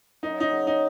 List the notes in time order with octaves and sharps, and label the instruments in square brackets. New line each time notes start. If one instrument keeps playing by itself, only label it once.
[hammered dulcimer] F#2 [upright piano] D#4
[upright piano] D#4
[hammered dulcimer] C#3 F#3 C#4
[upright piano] D#4